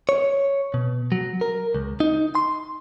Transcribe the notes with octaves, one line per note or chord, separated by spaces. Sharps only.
C#5
B2
F#3
A#4
C#2
D#4
C6